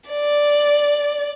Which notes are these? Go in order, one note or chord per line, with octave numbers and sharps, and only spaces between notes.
D5